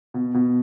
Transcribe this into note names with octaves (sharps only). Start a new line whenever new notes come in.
B2
B2